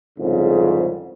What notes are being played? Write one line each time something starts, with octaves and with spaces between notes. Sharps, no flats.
C2 F2 G#2 C#3